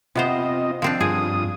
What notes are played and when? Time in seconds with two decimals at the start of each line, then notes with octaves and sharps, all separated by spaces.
0.16 C3 B3 C4 F4 C5 D#5
0.82 F3 C4 D4
1.00 G2 F4 G#4 D#6